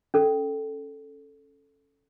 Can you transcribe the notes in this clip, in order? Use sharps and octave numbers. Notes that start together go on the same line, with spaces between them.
C#4 A4